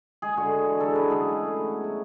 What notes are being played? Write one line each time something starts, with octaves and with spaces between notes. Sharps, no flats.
G#3 G#4
D3 F#4
G#3
E3
F#3 A4
C#3 B4
G#3 G#4
C#3
A3
F#3
B3
F#3